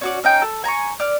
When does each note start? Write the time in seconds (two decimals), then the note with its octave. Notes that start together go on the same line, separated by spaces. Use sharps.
0.01 C#4 F#4 D5
0.24 C#4 D#4 G5
0.42 A4
0.64 G#5 A#5 B5 C#6
1.00 D5 F6